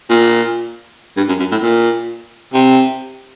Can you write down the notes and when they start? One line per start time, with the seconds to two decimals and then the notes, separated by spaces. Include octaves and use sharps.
0.10 A#2
1.17 G2
1.28 F#2
1.40 F#2
1.51 A2
1.62 A#2
2.54 C3